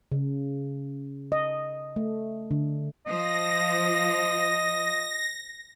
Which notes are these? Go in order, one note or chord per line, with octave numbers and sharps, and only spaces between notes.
C#3
D#5
A3
D3
F3 D#5 A#6